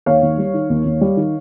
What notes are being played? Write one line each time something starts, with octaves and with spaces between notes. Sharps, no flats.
D#2 C#5 F5
D#2
G3
D#3
D#2
D#2
G3
D#3